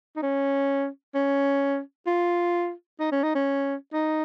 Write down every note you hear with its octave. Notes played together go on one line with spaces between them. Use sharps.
D#4
C#4
C#4
F4
D#4
C#4
D#4
C#4
D#4